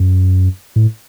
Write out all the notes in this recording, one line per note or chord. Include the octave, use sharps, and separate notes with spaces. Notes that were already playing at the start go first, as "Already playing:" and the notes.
Already playing: F#2
A2